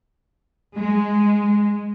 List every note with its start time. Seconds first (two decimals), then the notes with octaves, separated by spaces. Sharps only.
0.76 G#3